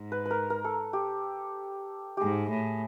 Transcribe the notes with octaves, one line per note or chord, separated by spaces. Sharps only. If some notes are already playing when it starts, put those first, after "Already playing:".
Already playing: G#2
B4
B4
A#4
A#4
A4
G4
G#2 G4 G#4
A2